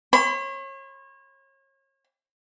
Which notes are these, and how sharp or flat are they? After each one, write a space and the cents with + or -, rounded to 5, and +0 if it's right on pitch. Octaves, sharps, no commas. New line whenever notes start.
C#5 -35 B5 +45